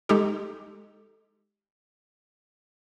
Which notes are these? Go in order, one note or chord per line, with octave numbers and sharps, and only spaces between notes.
G#3 D#4 G4 A4